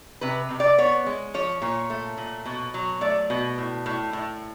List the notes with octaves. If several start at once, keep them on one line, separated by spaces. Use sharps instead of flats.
C3 B4
C3
D5
B3 C#5
G#3
F3 C#5
A#2 C#5
A3
A#2
B2
F#3
A3 D5
B2
A2
A2
A2